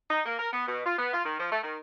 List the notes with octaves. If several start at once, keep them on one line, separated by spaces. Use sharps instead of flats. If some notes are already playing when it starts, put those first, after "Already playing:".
D#4
A#3
A#4
B3
B2
F4
B3
F4
D#3
F3
A3
D#3